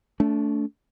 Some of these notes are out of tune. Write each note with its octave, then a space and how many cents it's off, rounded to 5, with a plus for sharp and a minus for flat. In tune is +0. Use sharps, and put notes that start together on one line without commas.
A3 +0 D4 -35